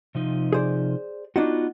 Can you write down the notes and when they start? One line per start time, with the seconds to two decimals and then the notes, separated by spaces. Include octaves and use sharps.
0.15 C3 F3 D#4
0.53 G#4 C5 D5
1.36 B3 D4 D#4 F4 F#4